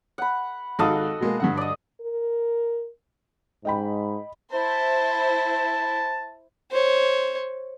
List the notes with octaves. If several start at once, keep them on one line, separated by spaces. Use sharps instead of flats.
F#5 B5
G#1 D#4 F#4 A4 D#5 F5
B2 G#3 A#3
G2 D3 F#5
D5 D#5
A#4
G#2 D#5 G5 B5
E4 C5 A5
C5 C#5